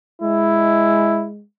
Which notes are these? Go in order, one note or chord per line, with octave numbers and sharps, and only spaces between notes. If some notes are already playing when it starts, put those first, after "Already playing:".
G#3 E4